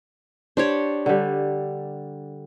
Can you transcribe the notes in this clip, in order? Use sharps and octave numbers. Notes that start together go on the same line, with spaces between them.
D4 G4 C5 C#5
D3 G3